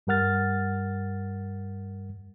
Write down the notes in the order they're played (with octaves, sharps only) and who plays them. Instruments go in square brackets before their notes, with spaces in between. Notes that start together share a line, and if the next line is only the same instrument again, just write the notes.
[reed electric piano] G2 G3 A#4 F#5 F6 A6